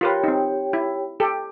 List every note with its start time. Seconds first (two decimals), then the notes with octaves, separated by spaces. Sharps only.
0.01 F4 G4 A#4 B4 C#5 G5
0.24 C4 D#4
0.73 E4
1.20 G4 A4